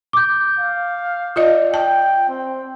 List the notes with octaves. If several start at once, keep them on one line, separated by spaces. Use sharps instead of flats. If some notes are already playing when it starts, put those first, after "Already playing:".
D6 G6
F5
F4 D5 D#5
G5 A5
C4